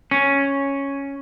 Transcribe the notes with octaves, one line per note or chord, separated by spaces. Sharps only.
C#4